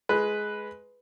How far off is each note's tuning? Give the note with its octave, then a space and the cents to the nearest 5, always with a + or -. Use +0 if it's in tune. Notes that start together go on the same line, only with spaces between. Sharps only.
G#3 +15 B4 +0